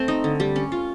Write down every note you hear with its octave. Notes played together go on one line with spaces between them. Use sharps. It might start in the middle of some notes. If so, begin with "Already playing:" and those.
Already playing: A3 C4
D#4
D3
G3
C#4
F4